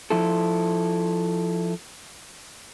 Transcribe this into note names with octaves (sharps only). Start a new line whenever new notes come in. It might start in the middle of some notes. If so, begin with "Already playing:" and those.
F3 E4 A4